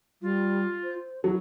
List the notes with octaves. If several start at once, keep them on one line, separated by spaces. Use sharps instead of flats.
G3 F4
C5
F#3 E4